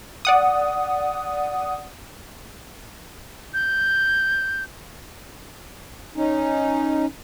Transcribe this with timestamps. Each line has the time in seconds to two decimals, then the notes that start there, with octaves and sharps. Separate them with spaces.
0.25 D5 F#5 D#6
3.54 G6
6.16 C#4 D#4